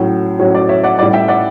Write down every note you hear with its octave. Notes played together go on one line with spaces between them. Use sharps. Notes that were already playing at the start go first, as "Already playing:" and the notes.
Already playing: A2 F#3 C#4
A2 F#3 C#4 C#5
D5
C#5 E5
D5 F#5
A2 G3 C#4 D5 F#5
E5 G5
D5 F#5